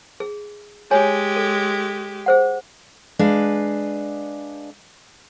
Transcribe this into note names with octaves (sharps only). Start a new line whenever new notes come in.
G#4
G#3 G4 G#4 C#5 G#5
A4
G#4 C5 F#5
G#3 D4 B4 F5